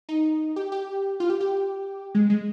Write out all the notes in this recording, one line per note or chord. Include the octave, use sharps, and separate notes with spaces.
D#4
G4
G4
F4
G4
G4
G#3
G#3